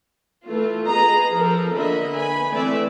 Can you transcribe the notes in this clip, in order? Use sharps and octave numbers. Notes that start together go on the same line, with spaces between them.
E3 A3 F4
G#4 B4 D#5 A#5
F3 A4 A#4
D3 A#3 D#5 E5 B5
B4 G#5 B5
E3 A3 C4 B4 D5 E5